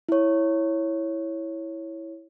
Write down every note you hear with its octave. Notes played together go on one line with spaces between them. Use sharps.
E4 C#5